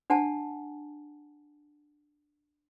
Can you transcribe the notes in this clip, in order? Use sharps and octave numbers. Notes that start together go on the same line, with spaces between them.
D4 F#5 G#5 A5